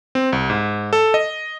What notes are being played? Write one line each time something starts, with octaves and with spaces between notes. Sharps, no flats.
C4
C2
G#2
A4
D#5